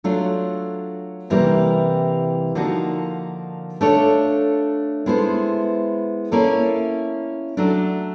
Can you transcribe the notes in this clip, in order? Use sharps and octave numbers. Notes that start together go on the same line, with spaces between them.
F#3 A3 D4 F4
C3 E3 G3 A#3
D3 F3 A#3 D#4 F#4
A3 D4 F4 A4 C#5
G#3 B3 E4 A4 C5
A#3 C#4 E4 A4 D5
F#3 A3 D4